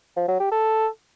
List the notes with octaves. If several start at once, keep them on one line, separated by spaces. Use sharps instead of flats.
F3
F#3
G4
A4